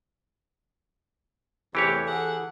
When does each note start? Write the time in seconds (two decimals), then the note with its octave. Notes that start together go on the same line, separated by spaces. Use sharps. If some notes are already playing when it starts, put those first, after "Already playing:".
1.75 E2 C3 E3 A3 G4 C#5
2.07 G#4 A4 F#5